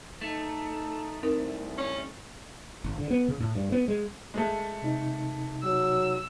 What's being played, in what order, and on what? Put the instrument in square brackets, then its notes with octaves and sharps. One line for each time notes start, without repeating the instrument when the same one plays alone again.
[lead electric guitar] A3 [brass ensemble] D#4 A4
[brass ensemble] C2 [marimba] C4 D#4 A#4
[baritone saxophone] C#4
[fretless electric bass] G#1
D3
B3
C#3
A2
G2
B3
G#3
[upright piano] G#3 A3
[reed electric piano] C3 D#4
[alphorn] F#3 [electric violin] E6